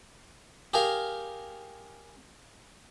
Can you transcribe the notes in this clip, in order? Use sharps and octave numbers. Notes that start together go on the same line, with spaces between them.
G4 G#4 A#4 F5